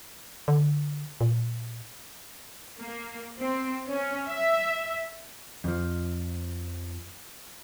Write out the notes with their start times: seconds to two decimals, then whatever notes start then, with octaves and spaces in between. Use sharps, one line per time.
0.48 D3
1.21 A#2
2.80 A#3
3.39 C4
3.88 C#4
4.26 E5
5.64 F2 F3